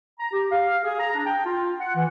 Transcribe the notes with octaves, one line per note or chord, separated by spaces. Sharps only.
A#5
G4
F5
G#4
A#5
D4
G5
F4
F#5
E3